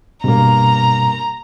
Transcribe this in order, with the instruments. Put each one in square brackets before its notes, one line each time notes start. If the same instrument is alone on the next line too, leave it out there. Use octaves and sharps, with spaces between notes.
[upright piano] G2 A#3 [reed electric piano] B2 [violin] A#5